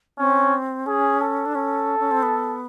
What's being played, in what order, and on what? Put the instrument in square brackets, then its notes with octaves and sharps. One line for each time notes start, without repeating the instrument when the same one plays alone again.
[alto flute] C4 [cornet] C#4
[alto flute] C#4 [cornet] G#4
[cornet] A4
[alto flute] D4
[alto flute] C#4 [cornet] A4
[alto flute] C#4
C4
B3